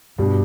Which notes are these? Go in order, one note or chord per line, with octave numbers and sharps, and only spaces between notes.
G2 B2 G3 D4 G4